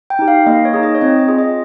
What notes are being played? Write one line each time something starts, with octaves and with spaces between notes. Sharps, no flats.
G5
D#4 G4
F5
A#3 D#5
C#5
D#4 G#4
D#5
C#5
C4 D#5
D#5
F4 G#4
D#5